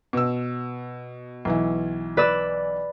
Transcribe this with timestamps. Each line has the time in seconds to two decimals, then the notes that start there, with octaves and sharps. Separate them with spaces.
0.13 B2 E6
1.45 B1 E3 E4
2.17 B4 D5 E6